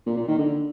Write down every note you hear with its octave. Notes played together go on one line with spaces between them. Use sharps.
A#2
A#2
D#3
D3